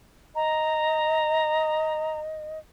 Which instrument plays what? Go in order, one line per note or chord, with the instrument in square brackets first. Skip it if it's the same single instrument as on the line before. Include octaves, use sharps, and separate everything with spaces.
[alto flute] D#5 [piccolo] A#5